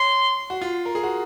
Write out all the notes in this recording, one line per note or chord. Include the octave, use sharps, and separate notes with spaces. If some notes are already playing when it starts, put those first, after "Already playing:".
Already playing: C#5 C6
F#4
F4
A#4
G#4
F#4